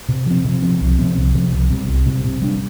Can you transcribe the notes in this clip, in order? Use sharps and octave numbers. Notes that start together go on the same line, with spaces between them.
C3
F3 C4
C3
F3 C4
C2
C3 F3 C4
C2
C3 F3 C4
C2
C3 G3
C2
C3 G3
C3
G3 D4